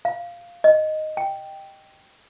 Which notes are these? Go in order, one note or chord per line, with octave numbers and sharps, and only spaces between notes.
F5
D#5
G5